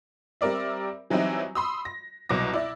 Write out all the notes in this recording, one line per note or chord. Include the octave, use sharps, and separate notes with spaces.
G3 C4 A#4 D5 E5
E3 F#3 G3 C4 D#4 E4
B5 C6 D#6 E6
A#6
C2 B2 F#3 D6 A#6
E4 D5